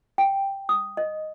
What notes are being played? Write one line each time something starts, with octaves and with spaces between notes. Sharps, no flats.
G5
D#6
D#5